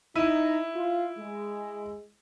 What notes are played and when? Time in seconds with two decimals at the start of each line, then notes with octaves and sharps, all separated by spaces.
0.15 D#4 E4 D#7
0.75 F4
1.17 G#3